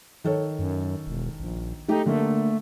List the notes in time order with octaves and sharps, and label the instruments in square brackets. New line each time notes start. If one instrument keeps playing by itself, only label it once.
[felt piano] D#3 A4 C#5
[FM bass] F#2
E1
A#1
[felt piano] A3 G4 [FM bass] D#4
[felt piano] D3 A#3 [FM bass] A3